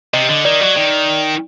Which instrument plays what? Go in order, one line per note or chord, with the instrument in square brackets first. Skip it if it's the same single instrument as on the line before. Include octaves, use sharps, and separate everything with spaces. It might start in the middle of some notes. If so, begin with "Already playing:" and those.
[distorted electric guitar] C3 [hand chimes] D#5
[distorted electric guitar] D3 [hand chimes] D#5
[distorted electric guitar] D#3 [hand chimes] D5
[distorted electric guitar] F#3
[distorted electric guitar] D#3 [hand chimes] D5